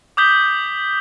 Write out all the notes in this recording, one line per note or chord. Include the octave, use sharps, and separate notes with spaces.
D6 D#6 G6 B6 G7